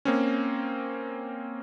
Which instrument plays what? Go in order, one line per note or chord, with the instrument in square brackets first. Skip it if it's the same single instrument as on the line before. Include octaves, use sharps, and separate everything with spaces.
[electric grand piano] A#3 C4 C#4